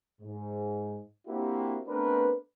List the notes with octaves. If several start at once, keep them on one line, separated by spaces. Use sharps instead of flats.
G#2
A#3 C4 D4 E4 F#4 G4
A3 B3 C4 D4 A#4 B4